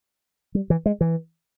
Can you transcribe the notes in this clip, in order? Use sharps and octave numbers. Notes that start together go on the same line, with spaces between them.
G3
E3
G#3
E3